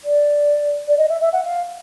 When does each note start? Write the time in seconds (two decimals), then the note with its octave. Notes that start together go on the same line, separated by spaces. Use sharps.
0.04 D5
0.88 D5
0.98 D#5
1.09 E5
1.21 E5
1.33 F#5
1.45 F5